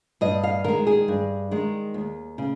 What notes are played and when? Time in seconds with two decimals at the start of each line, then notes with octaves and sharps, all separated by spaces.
0.21 G2 D#5
0.44 F5
0.64 D#3 G#3 A#4
0.87 G#4
1.08 G2
1.51 D#3 G#3
1.94 D#2
2.38 C#3